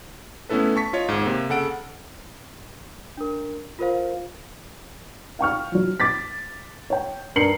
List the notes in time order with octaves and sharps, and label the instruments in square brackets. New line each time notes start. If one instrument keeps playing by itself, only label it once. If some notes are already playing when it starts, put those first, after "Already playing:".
[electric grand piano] A3 B3 C#4 E4 A4 B4
A5 C#6 B6
F4 C#5 D#5
G#1 G#2
C3 A#3
C#3 A4 F#5 D7
[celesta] D4 A#4
F4 A#4 C5 F5
[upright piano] F5 G5 C#6 F6
F3 F#3
D6 A6 B6
C#5 G5
G2 A#4 C7 C#7 F#7